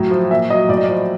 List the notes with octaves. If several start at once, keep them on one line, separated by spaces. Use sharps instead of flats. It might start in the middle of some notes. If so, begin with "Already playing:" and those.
Already playing: A2 F#3
F3
A#2 E5
F#3 D#5
A2 D5
D#5
D5
F3